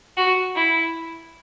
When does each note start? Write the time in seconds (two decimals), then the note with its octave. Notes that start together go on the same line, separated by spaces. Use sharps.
0.17 F#4
0.56 E4